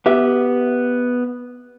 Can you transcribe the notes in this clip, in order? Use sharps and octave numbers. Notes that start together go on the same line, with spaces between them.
B3 G4 E5